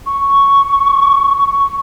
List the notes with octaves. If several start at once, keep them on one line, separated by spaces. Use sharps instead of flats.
C#6